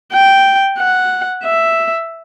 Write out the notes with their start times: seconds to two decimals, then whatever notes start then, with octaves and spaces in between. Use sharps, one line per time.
0.13 G5
0.78 F#5
1.44 E5